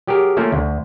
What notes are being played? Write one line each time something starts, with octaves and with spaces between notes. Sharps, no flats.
F#3 G4 G#4 A#4
A3 A#3 C#4 F4 A#4
D2